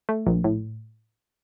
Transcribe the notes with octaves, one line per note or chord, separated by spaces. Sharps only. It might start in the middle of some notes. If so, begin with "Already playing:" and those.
A3
A#1
A2